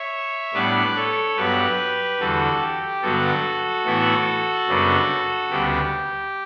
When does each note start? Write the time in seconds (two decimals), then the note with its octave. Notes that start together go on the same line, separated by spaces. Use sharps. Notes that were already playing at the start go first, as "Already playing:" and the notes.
Already playing: C#5 E5
0.54 A2 G3 B3 D4 B4 D5
0.95 A4 C#5
1.37 G2 F#3 B3 G4 B4
2.19 E2 D3 G3 F#4 A4
2.61 G4
3.02 G2 D3 F#3 B3 F#4 A4
3.85 A2 E3 B3 E4
4.68 F#2 C#3 G3 B3 D4
5.51 D2 C#3 G3 B3 D4 G4